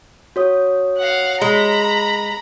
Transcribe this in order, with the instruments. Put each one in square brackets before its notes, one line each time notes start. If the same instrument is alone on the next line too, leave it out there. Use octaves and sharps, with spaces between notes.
[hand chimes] F#4 C#5 D#6
[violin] F5 F#5
[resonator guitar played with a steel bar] G#3 [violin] A#5 B5